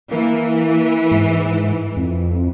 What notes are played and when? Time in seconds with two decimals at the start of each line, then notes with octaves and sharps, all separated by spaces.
0.11 E3 A#3
1.12 G#2
1.97 F2